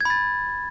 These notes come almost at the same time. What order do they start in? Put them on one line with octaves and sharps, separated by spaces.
G#6 B5 A6